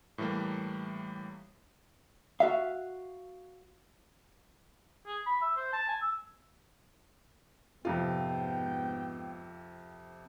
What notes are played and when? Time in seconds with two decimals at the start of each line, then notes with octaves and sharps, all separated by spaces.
0.18 A2 E3 G3 A3 A#3
2.40 F#4 E5 F5
5.07 G#4
5.26 B5
5.42 E5
5.57 C5
5.73 A5
5.88 G#5
6.01 E6
7.85 F2 G#2 C3 B3 F4 G5